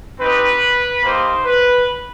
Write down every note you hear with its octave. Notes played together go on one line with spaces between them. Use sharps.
C4 D#4 G4 B4
A#3 D#4 G4 C5
B4